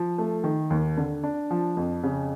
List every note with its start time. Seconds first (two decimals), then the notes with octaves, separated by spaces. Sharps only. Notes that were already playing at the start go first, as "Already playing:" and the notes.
Already playing: F3
0.18 A3
0.44 D#3
0.70 D#2
0.97 D3
1.23 D4
1.51 F3
1.77 F2
2.03 C#3